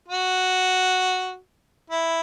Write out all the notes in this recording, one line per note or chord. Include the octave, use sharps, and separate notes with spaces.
F#4
E4